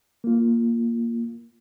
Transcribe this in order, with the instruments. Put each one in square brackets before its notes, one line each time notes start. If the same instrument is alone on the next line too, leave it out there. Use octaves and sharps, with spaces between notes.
[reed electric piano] A#3 F4